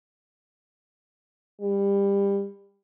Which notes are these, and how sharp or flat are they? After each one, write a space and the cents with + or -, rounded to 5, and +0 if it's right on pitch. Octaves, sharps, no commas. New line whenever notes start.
G3 +25